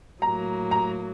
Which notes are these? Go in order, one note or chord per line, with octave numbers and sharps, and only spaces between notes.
A2 F#3 A#3 A#5
A#5